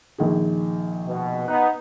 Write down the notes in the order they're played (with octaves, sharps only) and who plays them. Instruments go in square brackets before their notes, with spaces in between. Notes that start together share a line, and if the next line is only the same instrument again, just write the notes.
[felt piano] A#1 D#3 G#4
[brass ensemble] B2
[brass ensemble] B3 D#4 [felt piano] F#6